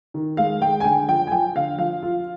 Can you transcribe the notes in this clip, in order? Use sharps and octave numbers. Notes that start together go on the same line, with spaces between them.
D#3
G#3 F5
G#3 G5
G#5
D3 G5
F3 G5
G#5
F3 G5
D3 F5
F3 F5
F4